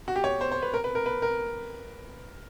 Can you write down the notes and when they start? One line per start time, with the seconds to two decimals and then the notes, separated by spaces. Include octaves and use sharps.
0.08 F#4
0.16 G4
0.24 C#5
0.41 C5
0.52 C5
0.62 B4
0.74 A#4
0.84 B4
0.95 A#4
1.06 B4
1.22 A#4